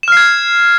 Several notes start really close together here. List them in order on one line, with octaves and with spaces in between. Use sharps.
E7 F6 C7 G#6